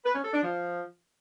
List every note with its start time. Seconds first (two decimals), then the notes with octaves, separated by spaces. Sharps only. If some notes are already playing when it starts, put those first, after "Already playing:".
0.05 B4
0.14 C#4
0.24 A4
0.33 D4
0.43 F3